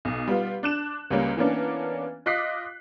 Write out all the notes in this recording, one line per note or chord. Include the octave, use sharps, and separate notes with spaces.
B1
G3 B3 F4
D4 F#6 E7
C#2 G3 A#3 C#4
E3 A#3 B3 C#4 D4
F4 D#5 D6 F#6 B6 C7